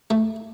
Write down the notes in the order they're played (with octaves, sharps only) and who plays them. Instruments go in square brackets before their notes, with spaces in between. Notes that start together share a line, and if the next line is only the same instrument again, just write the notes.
[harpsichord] A3